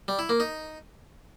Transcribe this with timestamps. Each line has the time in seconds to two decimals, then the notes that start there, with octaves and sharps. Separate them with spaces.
0.08 G3
0.19 E4
0.29 A#3
0.40 D#4